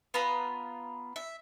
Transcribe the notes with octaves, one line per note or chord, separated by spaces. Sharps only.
B3 F4 A#5 B5
E5